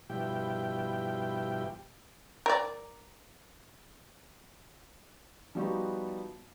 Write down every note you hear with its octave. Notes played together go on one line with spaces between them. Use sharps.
G2 B2 F3 E4 G4 G5
A#4 D5
F3 G3 B3 D#4 F#4 G4